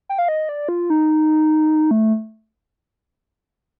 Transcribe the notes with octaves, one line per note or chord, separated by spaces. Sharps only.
G5
F5
D#5
D5
F4
D#4
A3